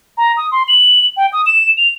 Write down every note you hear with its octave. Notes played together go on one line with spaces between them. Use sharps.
A#5
D#6
C6
F#7
G5
D#6
E7
F7